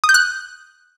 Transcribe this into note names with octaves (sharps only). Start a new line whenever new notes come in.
D#6
G6
F#6